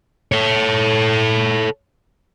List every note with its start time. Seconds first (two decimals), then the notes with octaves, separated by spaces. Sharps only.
0.32 A4 C#5